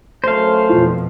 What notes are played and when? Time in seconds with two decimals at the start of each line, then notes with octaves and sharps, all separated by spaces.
0.24 F#2 A3 C5 F5
0.69 F2 B2 F4